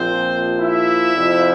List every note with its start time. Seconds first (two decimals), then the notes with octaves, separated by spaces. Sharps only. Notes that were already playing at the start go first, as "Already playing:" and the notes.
Already playing: A#1 A#2 F3 C4 C5
0.61 E4 E5
1.15 F2 C3 F3